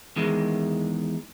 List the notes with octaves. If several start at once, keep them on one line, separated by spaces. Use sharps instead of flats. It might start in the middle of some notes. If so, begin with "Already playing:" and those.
E2 D#3 G#3